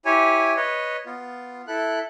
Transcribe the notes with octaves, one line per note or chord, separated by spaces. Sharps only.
E4 G4 C#5 G#5
B4 C#5 D#5
B3 F4
E4 A4 F#6